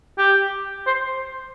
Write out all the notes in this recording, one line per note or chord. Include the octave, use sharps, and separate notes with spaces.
G4
C5